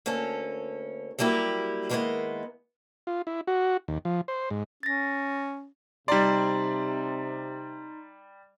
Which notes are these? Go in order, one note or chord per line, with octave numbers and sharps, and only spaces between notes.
D2 A#3 C#4 A4
F#3 G3 A#3 E4 G4
D#3 G#3 A#3 B3 E4 D#5
F4
E4
F#4
D#2
F3
C5
G#2
C#4 A6 A#6
C3 G3 D#4 D5 A#5 C6